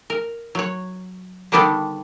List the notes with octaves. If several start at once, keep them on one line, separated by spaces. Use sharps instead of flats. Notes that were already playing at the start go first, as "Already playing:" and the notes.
A#4
F#3 C#5
D3 D#3 G3 B3 D4 A4